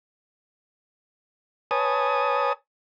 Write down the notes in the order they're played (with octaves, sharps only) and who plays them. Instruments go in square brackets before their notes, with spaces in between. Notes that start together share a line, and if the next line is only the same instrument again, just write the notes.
[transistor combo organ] B4 C#5 G#5 A5 D#6